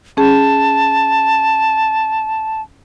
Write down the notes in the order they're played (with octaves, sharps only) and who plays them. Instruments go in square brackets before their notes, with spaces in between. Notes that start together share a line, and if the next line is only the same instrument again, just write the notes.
[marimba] C#4 G#4 [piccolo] A5